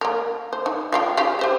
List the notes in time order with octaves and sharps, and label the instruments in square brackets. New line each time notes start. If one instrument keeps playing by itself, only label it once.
[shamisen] A#3 A#4
C5
D#4
F4 F5 G5
C#3 G4 F5
G4 C5 E5